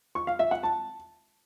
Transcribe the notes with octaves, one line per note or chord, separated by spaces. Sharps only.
C#6
F5
E5
F#5
A5